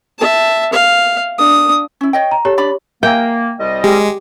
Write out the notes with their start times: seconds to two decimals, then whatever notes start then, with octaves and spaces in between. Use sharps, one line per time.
0.19 E5 A5
0.73 F5
1.38 D4 D#6
2.01 C#4 E4
2.13 C#5 D#5 G5
2.31 A#5
2.45 G4 A4 C#5
2.57 D4 D5 B5
3.03 A#3 A#4 E5 G5 G#5
3.59 C2 G3 D#5
3.84 G#3 G4